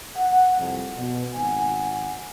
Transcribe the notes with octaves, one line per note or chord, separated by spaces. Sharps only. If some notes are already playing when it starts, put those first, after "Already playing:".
F#5
C2 F2
B2
G#1 F#5 G#5